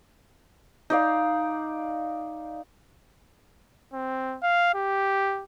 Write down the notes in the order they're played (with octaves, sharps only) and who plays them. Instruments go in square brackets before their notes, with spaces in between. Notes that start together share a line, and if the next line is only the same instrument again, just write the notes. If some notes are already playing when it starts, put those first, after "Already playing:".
[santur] D#4 D5 F5
[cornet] C4
F5
G4